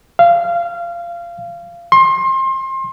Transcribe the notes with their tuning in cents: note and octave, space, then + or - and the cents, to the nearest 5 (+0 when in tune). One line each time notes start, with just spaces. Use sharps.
F5 -20
C6 +30